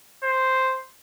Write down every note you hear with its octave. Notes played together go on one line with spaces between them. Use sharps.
C5